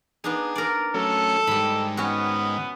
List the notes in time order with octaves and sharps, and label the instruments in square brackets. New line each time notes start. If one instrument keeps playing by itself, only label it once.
[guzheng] B3 D4 D#4 [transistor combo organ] G#4
[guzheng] A#4 D5
[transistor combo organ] F#3 A3 C#4 [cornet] A4
[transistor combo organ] G#2 D#3 [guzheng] G3 B5
[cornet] B3 [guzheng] C#4 F#4